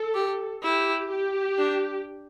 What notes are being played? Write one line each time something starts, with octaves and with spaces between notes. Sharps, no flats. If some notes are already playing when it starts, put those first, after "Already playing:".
Already playing: A4
G4
E4 G4
G4
D4